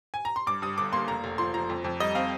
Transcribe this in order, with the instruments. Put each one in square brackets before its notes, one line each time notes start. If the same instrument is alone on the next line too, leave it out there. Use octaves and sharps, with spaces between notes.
[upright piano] G#5
A#5
C6
G2 D6
G2 D#6
G1 D6
A#3 C6
F1 A#5
F1
F3 C6
F3 A#5
F2
F2
G3 D#5
C4 F5